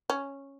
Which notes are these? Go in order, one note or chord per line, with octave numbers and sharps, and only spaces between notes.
C#4